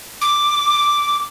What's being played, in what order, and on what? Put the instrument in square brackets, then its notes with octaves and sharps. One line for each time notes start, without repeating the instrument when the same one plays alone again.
[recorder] D6